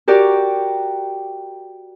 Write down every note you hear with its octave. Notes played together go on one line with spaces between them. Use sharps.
F#4 G4 A#4 D5